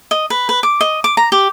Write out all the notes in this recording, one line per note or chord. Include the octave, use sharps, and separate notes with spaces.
D#5
B4
B4
D6
D#5
D6
A#5
G4